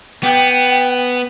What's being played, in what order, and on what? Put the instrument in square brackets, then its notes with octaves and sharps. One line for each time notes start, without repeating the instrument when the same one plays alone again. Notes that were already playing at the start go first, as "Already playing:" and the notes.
[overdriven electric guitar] B3 [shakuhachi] G5